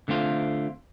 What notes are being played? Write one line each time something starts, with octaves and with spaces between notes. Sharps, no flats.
D3 A3 C4 F4